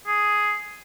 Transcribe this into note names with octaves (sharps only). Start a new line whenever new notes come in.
G#4